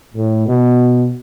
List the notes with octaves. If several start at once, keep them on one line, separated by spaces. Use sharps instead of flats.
A2
B2